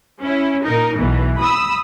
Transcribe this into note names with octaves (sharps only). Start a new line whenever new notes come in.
C#4 E4
A#2 D#4 A#4
B1 B2 E3
B5 D#6 E6